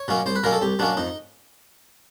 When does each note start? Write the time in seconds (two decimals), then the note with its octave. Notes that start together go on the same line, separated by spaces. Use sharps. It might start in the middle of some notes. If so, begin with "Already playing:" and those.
Already playing: C#5
0.08 B2 F#3 A#3 C#4
0.26 C2 C5
0.36 B4
0.43 B2 F#3 A#3 C#4 A#4
0.52 A4
0.62 C2 G4
0.79 B2 F#3 A#3 C#4 D4
0.97 F2 D#4